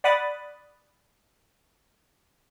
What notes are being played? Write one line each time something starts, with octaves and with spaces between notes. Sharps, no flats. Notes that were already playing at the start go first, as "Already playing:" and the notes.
D5 F#5 B5 D#6 F#6 A6